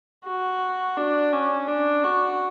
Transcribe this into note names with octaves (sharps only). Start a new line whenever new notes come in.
F#4
D4
C#4
D4
F#4